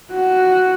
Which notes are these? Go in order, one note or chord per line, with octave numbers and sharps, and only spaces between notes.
F#4